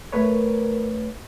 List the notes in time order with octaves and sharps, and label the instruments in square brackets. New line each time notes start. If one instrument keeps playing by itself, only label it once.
[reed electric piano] A3 B4 C#5 [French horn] A#4